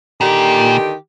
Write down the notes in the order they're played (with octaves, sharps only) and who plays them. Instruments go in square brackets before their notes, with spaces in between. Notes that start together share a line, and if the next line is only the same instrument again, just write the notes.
[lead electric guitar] A#2 [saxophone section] D3 D#3 G4